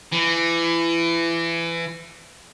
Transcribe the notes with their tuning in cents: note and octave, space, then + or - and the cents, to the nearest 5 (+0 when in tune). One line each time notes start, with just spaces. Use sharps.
E3 +25